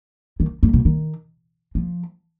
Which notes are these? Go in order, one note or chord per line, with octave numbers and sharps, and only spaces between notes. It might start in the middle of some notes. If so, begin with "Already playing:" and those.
D#3
G#2
B2
D#3
F3